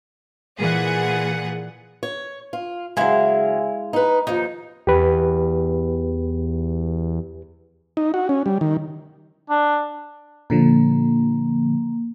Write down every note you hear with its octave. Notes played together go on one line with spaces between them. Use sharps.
A#2 E3 G#4 F#5
C#5
F4
C#3 F#3 G#3 E4 F5
D#4 B4
D#2 F3 D#4
E2 G4 B4
D#4
F#4
C#4
G3
D#3
D4
A#2 D3 F3 A#3